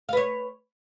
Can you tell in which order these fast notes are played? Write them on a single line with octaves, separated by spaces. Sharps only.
F5 B4 C#5